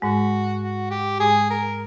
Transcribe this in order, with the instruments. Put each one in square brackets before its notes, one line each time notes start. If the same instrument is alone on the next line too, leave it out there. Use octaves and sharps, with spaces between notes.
[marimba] G#2 G#3 [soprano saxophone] F#4
[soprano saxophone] F#4
G4
[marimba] G#2 G#3 [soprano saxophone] G#4
[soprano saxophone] A#4